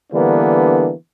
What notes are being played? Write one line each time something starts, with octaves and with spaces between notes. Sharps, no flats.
D3 E3 G3 A#3 B3 D4